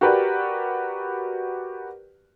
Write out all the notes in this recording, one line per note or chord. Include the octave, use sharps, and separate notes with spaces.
F#4 G4 A#4 B4 D5